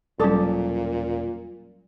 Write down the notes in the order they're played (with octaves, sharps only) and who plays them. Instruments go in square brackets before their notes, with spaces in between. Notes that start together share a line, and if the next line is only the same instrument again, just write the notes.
[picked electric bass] E1 C#4 [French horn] A#2 [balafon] F#3 G3 D6 [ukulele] A4 C5